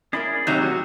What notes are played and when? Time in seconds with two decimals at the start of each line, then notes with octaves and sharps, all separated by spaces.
0.13 C#4 E4 G#4 A#4 D5 B5
0.47 D#2 A2 C3 F#3 D#4
0.61 F#4